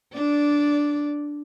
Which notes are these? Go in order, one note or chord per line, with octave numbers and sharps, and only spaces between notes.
D4 D5